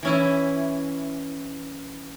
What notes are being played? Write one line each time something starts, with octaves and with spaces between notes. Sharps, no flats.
E3 C#4 E4